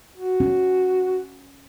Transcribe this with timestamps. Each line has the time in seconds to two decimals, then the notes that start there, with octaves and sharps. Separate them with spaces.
0.17 F#4
0.40 C#4